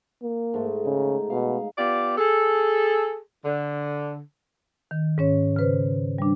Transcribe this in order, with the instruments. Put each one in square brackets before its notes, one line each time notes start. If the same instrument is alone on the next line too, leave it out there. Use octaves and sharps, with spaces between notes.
[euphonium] A#3
[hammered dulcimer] G#2 A3
[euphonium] C#3 [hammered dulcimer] D#4
[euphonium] B2 [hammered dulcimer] F5
[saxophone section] B3 F4 G4 D5
G#4 A4
D3
[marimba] D#3
G#2 C#4 C#5
C#3 B4 C5
G3 D4